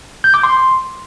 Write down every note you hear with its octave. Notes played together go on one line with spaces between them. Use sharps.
G6
D6
C6